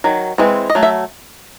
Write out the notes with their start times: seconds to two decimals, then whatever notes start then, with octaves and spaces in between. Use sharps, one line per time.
0.04 D#3 F#3
0.38 E3 G#3 C4
0.70 D#5
0.75 F#3 A3
0.83 E5